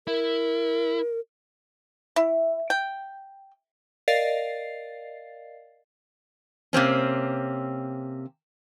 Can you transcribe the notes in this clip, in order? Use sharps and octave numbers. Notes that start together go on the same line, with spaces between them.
E4 A#4
E4
G5
A#4 D5 D#5 F5 A6 C7
C3 A#3 C4 C#4